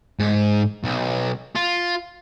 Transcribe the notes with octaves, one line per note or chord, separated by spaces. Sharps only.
G#2
B1
F4